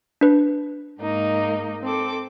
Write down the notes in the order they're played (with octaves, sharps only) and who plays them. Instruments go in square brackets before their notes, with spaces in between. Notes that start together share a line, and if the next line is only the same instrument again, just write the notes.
[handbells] D4 B4
[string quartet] G#2 A#3 D#4
C4 A4 D6